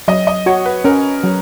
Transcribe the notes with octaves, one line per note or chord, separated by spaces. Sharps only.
F#3 D#5
D#5
F#4 C#5
B4
C#4 A#4
F#3